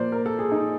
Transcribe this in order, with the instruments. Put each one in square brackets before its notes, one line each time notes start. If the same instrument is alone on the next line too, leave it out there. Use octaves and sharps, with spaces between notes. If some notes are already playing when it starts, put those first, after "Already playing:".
Already playing: [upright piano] A#2 F3 A#3 C5 D5
A#4
A4
G#4
D#4